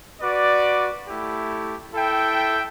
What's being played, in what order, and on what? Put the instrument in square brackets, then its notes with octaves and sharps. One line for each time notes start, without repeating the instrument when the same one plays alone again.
[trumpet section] F#4 B4 D5
A3 E4 G4
E4 A4 E5 G5